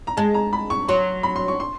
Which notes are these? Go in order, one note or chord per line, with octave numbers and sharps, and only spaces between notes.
A#5
G#3 A5
A#5
B5
C#6
F#3 C6
B5
C6
C#6
C6